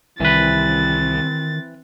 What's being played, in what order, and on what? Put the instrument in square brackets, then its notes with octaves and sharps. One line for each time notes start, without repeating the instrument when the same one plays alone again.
[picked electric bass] C2 [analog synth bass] D#3 [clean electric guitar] E3 B4 [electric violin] C4 A6